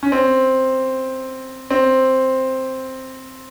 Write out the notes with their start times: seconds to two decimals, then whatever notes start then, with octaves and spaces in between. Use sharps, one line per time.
0.03 C#4
0.12 C4
1.70 C4